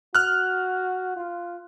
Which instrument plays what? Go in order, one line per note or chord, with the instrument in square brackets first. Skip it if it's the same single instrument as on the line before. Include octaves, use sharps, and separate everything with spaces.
[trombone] F#4 [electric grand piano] F6 F#6
[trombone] F4